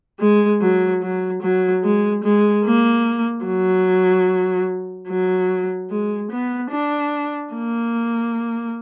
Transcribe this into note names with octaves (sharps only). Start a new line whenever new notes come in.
G#3
F#3
F#3
F#3
G#3
G#3
A#3
F#3
F#3
G#3
B3
D4
A#3